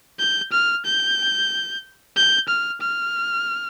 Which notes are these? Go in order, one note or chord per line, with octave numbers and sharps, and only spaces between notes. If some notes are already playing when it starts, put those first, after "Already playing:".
G6
F6
G6
G6
F6
F6